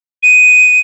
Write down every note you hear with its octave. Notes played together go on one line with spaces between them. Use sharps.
D#7